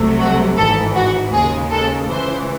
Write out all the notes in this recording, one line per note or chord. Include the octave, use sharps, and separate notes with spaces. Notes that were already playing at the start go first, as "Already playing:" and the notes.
Already playing: C2 C3 F#3 A3
F#4
G#1 G#2 E3 A4
F#4
D#2 C#3 G#3 G#4
A4
C#2 C#3 E3 C5